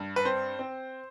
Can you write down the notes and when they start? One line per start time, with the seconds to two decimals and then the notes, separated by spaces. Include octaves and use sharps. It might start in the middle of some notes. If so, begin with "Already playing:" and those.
Already playing: G2
0.16 B4
0.25 C4 C5
0.59 C4